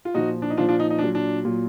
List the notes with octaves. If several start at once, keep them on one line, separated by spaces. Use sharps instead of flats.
F4
A#2 F3 D#4 F#4
D4
D#4
A#2 F3 D4 F4
D4 F4
D#4
D#4
A#2 F#3 D4
D4
A#2 F#3